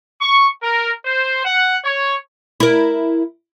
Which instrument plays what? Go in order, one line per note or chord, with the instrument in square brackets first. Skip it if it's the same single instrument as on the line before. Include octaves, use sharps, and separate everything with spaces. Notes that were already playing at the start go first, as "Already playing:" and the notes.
[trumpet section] C#6
A#4
C5
F#5
C#5
[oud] E4 A#4